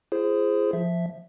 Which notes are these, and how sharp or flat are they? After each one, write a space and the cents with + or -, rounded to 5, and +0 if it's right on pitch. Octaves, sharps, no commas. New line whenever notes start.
F4 -45 G#4 +5 C5 +0
F3 +0 E5 +0